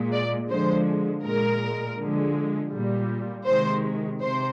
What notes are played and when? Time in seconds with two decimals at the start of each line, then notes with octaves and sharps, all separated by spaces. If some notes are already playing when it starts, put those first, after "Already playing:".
Already playing: A#2 G#3
0.13 D5
0.50 D3 F3 G#3 C5
1.24 A#2 G#3 A#4
1.99 D3 F3 G#3
2.73 A#2 G3
3.47 C3 D#3 G#3 C5
4.21 C3 C5